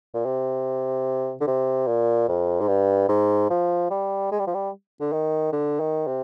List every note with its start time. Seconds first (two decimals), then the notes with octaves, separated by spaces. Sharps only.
0.14 A#2
0.25 C3
1.41 D3
1.47 C3
1.87 A#2
2.28 F2
2.61 G#2
2.68 G2
3.09 G#2
3.50 F3
3.90 G3
4.31 G#3
4.39 G3
4.47 F3
4.54 G3
5.00 D3
5.12 D#3
5.53 D3
5.80 D#3
6.07 C3